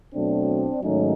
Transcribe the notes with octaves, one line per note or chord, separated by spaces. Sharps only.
B2 F#3 A3 C4 D4
G#2 D#3 F#3 A3 C#4 D#4